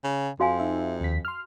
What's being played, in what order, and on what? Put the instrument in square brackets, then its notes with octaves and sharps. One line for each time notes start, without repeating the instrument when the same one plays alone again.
[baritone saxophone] C#3
[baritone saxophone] F2 [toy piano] F#4 F5 G#5
[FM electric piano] D#4 E5
D#2 B6
C6 F6